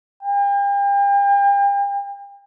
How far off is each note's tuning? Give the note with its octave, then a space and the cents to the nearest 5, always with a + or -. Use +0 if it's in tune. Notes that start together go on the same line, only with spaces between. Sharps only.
G5 +40